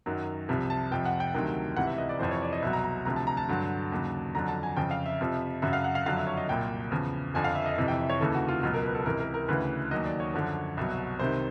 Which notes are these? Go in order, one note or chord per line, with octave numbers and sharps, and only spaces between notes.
F#2 D#3 F#3
C2 C3 F3
A5
F2 C3 F3 G5
F#5
G5
D2 C3 D#3 F#3
C#2 C3 E3 F#5
E5
D#5
D5
F2 C3 E3 C5
C#5
D5
D#5
C2 B2 F#3 E5
A#5
A#5
D2 C3 F3 A#5
A5
A#5
A5
G2 D3 F#3
D#2 C#3 F#3
F2 D3 F#3 A#5
A5
G#5
F2 C#3 F3 G5
F5
E5
F2 C3 F3
F#2 C#3 F#3 E5
F5
F#5
F5
F2 D3 F#3 F5
E5
C#5
D#5
C2 A#2 F#3 G5
E2 C#3 F3
F2 D3 F3 G#5
F5
E5
D#5
F2 C3 E3 D#5
G5
E5
C#5
D#2 C#3 E3 A4
F#4
F4
C#2 B2 F#3 F4
A#4
B4
A4
C#2 C3 E3 A#4
A#4
A#4
D2 C#3 E3 B4
D#2 D#3 F#3 D#5
D5
C#5
F#2 D3 F3
C2 B2 F#3
C2 C3 D#3 C5